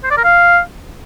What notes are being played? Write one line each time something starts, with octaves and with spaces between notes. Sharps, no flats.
C5
D5
A#4
F5